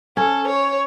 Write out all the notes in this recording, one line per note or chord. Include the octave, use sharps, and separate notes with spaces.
C#4 A4
C#5